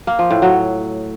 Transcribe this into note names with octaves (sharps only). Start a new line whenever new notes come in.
A#3
F3
A2
F#3